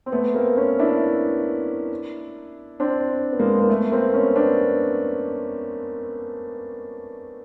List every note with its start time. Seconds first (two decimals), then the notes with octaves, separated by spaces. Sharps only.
0.06 C4
0.12 A3 B3
0.34 A#3 C4
0.57 B3 C#4
0.79 D4 E4
2.80 C4 D4
3.32 B3
3.40 G#3 A#3
3.60 A#3
3.69 A3 B3
3.92 A#3 C4
4.14 B3 C#4
4.36 C4 D4